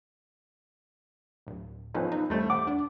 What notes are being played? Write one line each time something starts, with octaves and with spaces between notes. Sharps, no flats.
D1
B1 F3 C#4 B4
D#4
E2 G3 A3
F#5 D6
D4